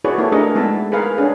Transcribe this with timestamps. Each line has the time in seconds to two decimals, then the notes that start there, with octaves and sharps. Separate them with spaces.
0.04 E4 F#4 G#4 B4 C#5 D5
0.18 A#3 E4 G4 A4
0.32 A3 D4 G#4 A#4 B4 D#5
0.55 G#3 B3 E4 E5 A5
0.92 G#4 A#4 B4 F5
1.18 C#4 D4 G#4 B4